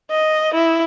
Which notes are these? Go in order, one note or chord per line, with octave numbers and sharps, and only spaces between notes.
D#5
E4